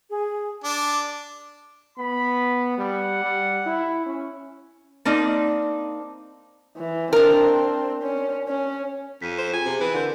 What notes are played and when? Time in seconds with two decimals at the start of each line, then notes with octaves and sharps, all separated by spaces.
0.10 G#4
0.64 D4 D6
1.98 B3 B5
2.78 G3 F#5
3.24 G3
3.66 E4
4.06 C#4
5.05 A#3 C4 D4 D#4
6.77 E3
7.13 C4 D4 A#4
8.03 C#4
8.48 C#4
9.22 F2 B6 D#7
9.38 C5
9.53 F4 G#4 G5 G#5
9.66 C3 F#4 G#4
9.80 E3 B4
9.93 D3 A#4 C6 G6